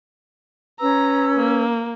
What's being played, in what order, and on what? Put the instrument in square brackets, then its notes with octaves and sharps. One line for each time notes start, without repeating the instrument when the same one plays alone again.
[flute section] C#4 B4 E6 [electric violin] A#5
[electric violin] A#3